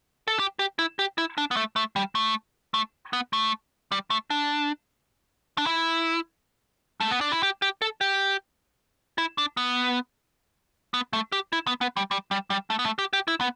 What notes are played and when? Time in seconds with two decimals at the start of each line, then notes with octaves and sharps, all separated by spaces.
0.28 A4
0.39 G4
0.59 G4
0.79 E4
0.99 G4
1.18 E4
1.38 D4
1.51 B3
1.56 A3
1.76 A3
1.96 G3
2.15 A3
2.74 A3
3.13 B3
3.33 A3
3.92 G3
4.10 A3
4.30 D4
5.58 D4
5.66 E4
7.00 A3
7.11 B3
7.21 D4
7.32 E4
7.43 G4
7.62 G4
7.82 A4
8.01 G4
9.18 E4
9.38 D4
9.57 B3
10.94 B3
11.13 A3
11.32 G4
11.53 E4
11.67 B3
11.81 B3
11.97 G3
12.11 G3
12.31 G3
12.50 G3
12.70 A3
12.79 B3
12.85 A3
12.99 G4
13.13 G4
13.28 E4
13.41 B3